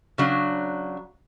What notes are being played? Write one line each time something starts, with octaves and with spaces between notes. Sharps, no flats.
C#3 F#3 D4